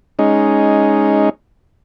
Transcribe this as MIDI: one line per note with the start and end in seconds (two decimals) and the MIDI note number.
0.19 1.29 56
0.19 1.29 61
0.19 1.29 63